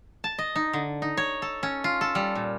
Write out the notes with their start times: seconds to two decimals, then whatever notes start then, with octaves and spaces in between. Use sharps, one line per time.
0.24 A5
0.39 D#5
0.56 D#4
0.73 D3
1.02 D#4
1.17 C#5
1.42 A4
1.63 C#4
1.84 F4
2.01 A4
2.15 G3
2.35 A#2